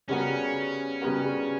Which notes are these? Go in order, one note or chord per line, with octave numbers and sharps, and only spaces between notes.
C#3 G3 B3 C#4 F#4 A#4
C#3 G3 B3 F#4 A#4